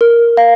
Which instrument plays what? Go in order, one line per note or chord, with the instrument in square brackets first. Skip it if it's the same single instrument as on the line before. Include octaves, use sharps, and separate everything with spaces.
[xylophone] A#4
F5